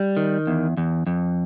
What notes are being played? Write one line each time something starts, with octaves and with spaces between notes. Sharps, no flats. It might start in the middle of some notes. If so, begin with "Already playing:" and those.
Already playing: G3
D#3
E2
E2
F2